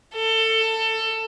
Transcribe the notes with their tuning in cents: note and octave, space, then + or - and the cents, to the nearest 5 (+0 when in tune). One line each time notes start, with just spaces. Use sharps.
A4 +20